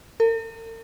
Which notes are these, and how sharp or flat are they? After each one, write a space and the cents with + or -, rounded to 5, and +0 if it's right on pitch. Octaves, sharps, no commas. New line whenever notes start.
A#4 -45